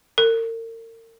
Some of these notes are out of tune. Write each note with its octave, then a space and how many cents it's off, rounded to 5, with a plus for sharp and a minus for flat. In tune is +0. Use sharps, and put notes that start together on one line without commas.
A#4 -40